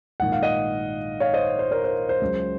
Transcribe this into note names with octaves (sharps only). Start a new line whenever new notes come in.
A#1 G#2 D#3 F#5
F5
D#5 F#5
C#5 F5
C5 D#5
C5
A#4 C#5
C5
C5
C#2 C#3 F#3